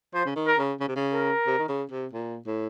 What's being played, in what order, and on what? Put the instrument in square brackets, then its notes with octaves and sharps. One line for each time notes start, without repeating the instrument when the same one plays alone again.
[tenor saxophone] F3 [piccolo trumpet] C5
[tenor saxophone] C#3
D#3
[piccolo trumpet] A#4
[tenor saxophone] C#3
C#3
C3
C#3
[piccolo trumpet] A#4
[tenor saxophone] C3
D#3
C#3
C3
A#2
A2